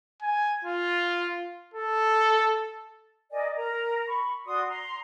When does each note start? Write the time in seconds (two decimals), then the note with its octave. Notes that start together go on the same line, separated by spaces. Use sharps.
0.22 G#5
0.65 F4
1.74 A4
3.31 A#4 D5 D#5 G#5
3.56 A#4 A#5
4.07 B5 C#6
4.46 F#4 D5 C6 D#6
4.68 A#5 C6